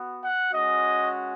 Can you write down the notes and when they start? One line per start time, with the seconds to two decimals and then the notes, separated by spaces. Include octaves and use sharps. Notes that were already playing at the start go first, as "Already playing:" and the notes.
Already playing: B3 F#4
0.22 F#5
0.52 G#3 C#4 F#4 D#5